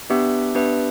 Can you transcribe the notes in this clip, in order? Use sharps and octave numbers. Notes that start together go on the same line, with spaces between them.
B3 D4 G4 B4 E5
B3 D4 G4 B4 E5